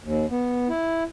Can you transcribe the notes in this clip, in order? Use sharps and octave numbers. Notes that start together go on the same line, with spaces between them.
D#2
B3
E4